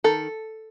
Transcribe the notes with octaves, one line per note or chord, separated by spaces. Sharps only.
D#3 A4